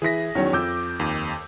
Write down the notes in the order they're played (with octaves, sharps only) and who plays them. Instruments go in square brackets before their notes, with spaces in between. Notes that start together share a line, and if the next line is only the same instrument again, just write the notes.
[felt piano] E3 E4 B6 [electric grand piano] G#4 A#6
[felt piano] E2 D#3 F#3 [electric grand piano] C#4 C#5
[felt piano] F2 [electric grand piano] D6 E6 G6
[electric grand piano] D#2